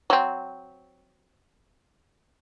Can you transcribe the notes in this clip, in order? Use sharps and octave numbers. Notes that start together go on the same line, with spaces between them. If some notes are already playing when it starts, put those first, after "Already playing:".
F#3 C4